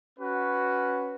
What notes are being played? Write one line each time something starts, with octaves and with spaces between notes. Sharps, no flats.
C#4 F#4 B4